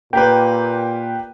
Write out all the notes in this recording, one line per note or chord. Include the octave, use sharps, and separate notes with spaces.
A#2 A#3 G4 B4 G5